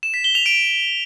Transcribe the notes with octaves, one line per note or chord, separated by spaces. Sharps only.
E7
B6
G7
F7
D7